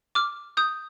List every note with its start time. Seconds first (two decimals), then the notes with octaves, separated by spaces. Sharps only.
0.15 D6 F6
0.57 D#6 G6